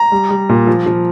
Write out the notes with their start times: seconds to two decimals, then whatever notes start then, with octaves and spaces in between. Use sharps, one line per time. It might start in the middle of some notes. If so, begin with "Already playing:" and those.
Already playing: A#5
0.12 G3
0.31 G3
0.49 A#2
0.67 F3
0.86 F3